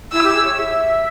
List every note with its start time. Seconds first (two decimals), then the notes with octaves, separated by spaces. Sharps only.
0.13 E4 E6
0.24 G4
0.34 G#4
0.45 C#5
0.56 E5